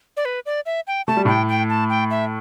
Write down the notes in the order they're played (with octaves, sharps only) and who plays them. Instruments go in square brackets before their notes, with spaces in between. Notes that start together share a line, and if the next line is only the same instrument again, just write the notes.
[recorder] D5
B4
D5
E5
G5
[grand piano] A3 [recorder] A5
[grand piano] G3
[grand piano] A2 A3 [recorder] G5
[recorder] G5
A5
G5
E5